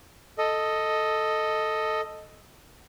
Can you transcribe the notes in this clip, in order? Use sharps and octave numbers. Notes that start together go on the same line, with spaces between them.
A4 D#5